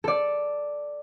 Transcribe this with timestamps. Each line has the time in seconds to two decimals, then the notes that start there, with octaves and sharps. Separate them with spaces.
0.04 A4 D5